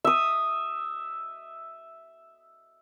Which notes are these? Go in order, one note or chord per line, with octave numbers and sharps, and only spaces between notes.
E5 D#6